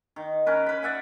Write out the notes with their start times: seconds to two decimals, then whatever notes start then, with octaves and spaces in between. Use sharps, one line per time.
0.16 D#3
0.46 C#4 A#4 B4
0.66 B4 B5
0.82 D5 E5 F#5 G#5